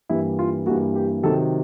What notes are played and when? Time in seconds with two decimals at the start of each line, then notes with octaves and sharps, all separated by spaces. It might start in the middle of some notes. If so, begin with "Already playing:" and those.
0.09 G2 E3 G3 A#3 E4
0.39 F4
0.66 G2 E3 G3 A#3 F#4
0.95 G4
1.23 C3 D#3 F#3 A4